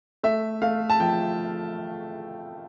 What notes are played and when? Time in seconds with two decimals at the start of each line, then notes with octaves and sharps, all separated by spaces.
0.23 A3 E5
0.62 A3 F5
0.90 A5
1.00 F3 G5